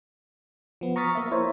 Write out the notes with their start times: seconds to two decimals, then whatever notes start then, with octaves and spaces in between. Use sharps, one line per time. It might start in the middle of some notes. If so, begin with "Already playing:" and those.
0.81 F3 B3
0.96 A#5 C#6 D#6 F6 A6 B6
1.15 A#3 E5
1.31 E4 A#4 C5 C#5